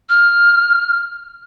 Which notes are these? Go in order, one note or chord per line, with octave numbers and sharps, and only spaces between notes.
F6